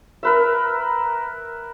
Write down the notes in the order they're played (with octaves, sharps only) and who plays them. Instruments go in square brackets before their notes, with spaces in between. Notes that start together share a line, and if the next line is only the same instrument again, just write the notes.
[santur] A#4 B4 E5